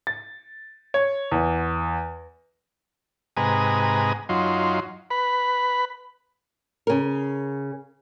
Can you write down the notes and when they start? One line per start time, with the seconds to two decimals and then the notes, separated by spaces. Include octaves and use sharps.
0.07 A6
0.94 C#5
1.32 E2
3.37 G#2 C3 B4 G#5 A#5 D#6
4.29 F#2 F#3 D#4 F4 C6
5.10 B4 B5
6.87 C#3 A#4